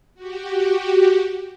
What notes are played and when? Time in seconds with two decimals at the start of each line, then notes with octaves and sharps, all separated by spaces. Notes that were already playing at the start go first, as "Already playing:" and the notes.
0.15 F#4 G4